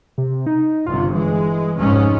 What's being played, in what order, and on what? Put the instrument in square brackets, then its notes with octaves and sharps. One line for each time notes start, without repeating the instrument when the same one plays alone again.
[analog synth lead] C3
D#4
[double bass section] G1 C3 [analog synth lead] F4
[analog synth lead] E3 [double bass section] G#3
[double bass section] F1 G#2 C#4